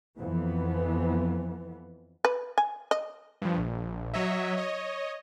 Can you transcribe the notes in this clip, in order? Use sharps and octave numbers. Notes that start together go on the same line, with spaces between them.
F2 E3 B3
B4
G#5
D#5
G2 F3
A#1
F#3 C#5 D#5 E5
C#5 D#5